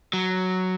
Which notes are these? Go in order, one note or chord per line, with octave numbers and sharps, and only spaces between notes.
F#3